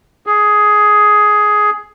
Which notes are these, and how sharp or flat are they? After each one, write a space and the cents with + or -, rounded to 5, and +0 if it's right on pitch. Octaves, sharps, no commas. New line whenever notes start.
G#4 +10